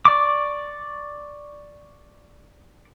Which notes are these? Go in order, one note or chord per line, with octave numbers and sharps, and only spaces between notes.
D5 C#6 D6